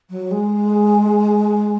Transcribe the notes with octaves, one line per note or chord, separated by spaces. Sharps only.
F#3
G#3